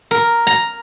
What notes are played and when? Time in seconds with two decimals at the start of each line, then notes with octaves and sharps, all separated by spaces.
0.11 A#4
0.47 A#5